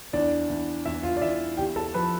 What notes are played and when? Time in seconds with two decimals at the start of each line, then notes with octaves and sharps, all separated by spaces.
0.13 E2 D4 D5
0.49 E2
0.85 E2 E4 E5
1.03 F4 F5
1.17 D5
1.22 E2 E4 E5
1.57 E2 G4 G5
1.76 A4 A5
1.94 F3 B4 B5